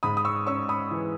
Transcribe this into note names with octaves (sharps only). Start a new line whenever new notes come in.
G#2 B5 D#6
D#6
C#6 E6
C#4 C#6 E6
B5 D#6
E3